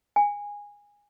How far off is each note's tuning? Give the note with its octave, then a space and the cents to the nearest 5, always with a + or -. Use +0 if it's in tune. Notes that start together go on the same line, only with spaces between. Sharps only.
G#5 -15